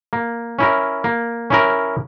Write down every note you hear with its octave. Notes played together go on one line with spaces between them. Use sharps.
A#3
C#4 E4 A#4
A#3
C#4 E4 A#4